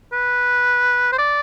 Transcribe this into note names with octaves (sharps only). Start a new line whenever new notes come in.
B4
C5
D5